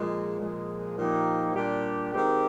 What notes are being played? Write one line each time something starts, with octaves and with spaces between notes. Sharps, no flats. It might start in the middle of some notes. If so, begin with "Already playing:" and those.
Already playing: A#2 F3 G#3
A#2 F3 G#3
A#2 F3 A#3 D#4 G4
A#2 G3 D4 G4
D#3 G#3 C4 G4